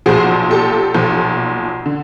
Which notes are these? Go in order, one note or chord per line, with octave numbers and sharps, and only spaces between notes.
B1 A#2 F3 F#4 G#4
G4 A4
B1 A#2 F3
D3